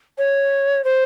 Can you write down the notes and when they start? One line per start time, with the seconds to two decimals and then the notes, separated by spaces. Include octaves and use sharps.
0.18 C#5
0.84 C5